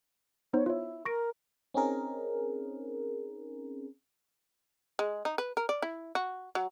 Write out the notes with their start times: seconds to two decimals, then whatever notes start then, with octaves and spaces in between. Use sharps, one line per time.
0.53 B3 D#4 C5 C#5
0.66 E4 F4 C#5
1.05 A#4 C#6 A#6 D7
1.74 C4 C#4 D#4 G#4 A#4
4.99 G#3
5.25 D#4
5.38 B4
5.57 A#4
5.69 D5
5.82 E4
6.15 F#4
6.55 F#3